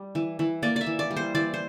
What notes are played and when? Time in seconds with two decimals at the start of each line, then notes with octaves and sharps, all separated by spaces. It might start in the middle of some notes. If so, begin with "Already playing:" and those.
Already playing: G3
0.15 E3
0.39 E3
0.63 A#3 D5
0.76 D5 E5
0.86 E3
0.99 D5
1.11 G3
1.17 C5
1.35 E3 D5
1.54 C5